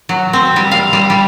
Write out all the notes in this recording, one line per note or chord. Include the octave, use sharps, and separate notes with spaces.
F#3
C4
G3
F5
G3
G3